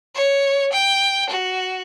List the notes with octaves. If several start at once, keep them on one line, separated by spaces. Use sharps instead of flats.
C#5
G5
F#4